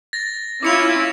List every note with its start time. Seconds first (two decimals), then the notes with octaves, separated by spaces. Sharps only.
0.13 A6 A#6
0.63 C#4 E4 F4 D6 C#7 F7